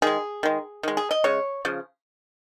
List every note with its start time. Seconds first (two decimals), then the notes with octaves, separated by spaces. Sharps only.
0.02 D#3 G#3 G#4
0.43 D#3 G#3
0.83 D#3 G#3
0.97 G#4
1.11 D#5
1.24 C#3 G#3 C#5
1.65 C#3 F3